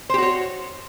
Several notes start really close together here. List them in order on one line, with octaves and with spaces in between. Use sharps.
C5 G4 F#4 C#5